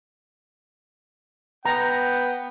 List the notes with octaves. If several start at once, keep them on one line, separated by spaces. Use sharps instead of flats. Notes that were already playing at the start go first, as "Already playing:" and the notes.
B3 G5 A#5